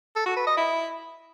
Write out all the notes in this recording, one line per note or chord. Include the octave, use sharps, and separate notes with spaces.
A4
F#4
B4
D#5
E4